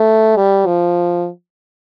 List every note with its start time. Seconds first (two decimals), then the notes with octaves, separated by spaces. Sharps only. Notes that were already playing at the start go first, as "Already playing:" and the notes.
Already playing: A3
0.36 G3
0.66 F3